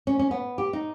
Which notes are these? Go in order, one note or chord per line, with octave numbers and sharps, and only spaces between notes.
C#4
C#4
B3
G4
D#4